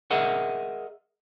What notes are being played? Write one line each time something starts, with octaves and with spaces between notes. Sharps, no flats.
G#4 A#4 D#5 E5 F#5